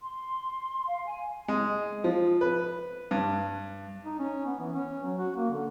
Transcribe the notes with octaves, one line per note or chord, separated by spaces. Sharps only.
C6
F5
G#5
G#3
F3
B4
G2
D#4
C#4
B3
E3
C#4
F#3
F#4
A#3
D3